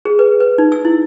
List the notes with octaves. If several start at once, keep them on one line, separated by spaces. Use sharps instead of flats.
G#4
B4
B4
D#4
E6
E4